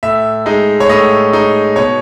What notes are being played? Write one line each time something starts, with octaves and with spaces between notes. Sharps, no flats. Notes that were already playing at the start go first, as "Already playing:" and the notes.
A2 E5
G#3 D#4
C#5
A2 D#5
G#3 D#4
B2 C#5